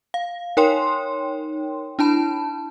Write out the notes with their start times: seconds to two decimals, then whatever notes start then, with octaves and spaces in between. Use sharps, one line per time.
0.14 F5
0.57 D#4 A#4 C#5 G5 C6
1.99 D4 E4 A5 B5